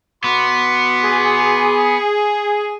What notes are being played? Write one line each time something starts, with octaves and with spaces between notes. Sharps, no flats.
B3 F#4 C6 D6
G#4